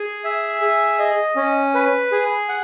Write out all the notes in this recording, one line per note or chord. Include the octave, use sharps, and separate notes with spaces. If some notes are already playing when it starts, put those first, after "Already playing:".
Already playing: G#4 G#5
E5
G#4
D#5
C#4
B4
G#4
F#5